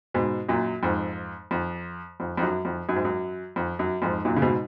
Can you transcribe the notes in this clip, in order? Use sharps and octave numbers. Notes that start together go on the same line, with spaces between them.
G#2 B2
F#2 A#2
F2 G#2
F2
F2
F2
F#2
F2
F#2
G#2
F#2
F2
F#2
F2 G#2
F#2 A#2
C#3
G#2 B2